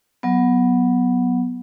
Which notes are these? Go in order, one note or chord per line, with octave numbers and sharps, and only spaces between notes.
F#3 B3